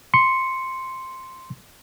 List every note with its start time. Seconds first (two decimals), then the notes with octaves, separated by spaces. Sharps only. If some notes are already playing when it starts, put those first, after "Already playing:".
0.14 C6 C#7